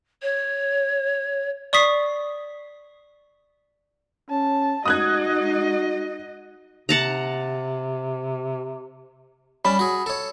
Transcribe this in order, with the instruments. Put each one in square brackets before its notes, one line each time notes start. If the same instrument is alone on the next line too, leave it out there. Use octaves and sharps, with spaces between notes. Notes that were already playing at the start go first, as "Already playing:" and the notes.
[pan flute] C#5
[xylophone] D5 C#6 D#6 B6 C7
[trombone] C#4 [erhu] A5
[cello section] G#3 D#4 [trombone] F#4 [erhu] D#5 [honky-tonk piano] D#6 F#6 G#6
[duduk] C3 [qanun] F#5 A5 A#5
[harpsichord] G3 C#4 A5 [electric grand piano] B5
[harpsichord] F#4 G#4
A4 C#5